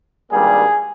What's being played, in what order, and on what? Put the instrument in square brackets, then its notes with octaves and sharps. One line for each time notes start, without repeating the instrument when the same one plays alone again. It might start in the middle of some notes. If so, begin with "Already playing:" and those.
[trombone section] G#1 G2 G3 A#3 G#4